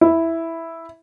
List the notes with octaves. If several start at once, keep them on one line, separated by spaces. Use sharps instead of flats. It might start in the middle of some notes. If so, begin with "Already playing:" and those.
E4